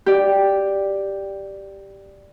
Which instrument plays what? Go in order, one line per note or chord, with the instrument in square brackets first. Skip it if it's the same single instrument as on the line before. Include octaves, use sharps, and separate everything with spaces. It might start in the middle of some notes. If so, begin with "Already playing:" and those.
[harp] G4 D5